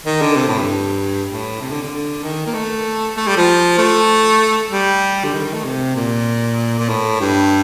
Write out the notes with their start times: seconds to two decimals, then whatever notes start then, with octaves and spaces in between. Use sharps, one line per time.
0.06 D#3
0.21 D3
0.36 C3
0.47 A2
0.58 G2
1.29 A2
1.61 C3
1.72 D3
1.82 D3
2.23 D#3
2.46 A#3
2.54 A3
3.17 A3
3.27 G3
3.37 F3
3.78 A3
4.71 G3
5.24 D3
5.33 D#3
5.44 D#3
5.54 A3
5.64 C3
5.96 A#2
6.78 A#2
6.89 A2
7.20 G2